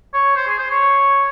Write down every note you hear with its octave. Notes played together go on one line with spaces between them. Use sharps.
C#5
C5
G#4
C5
C#5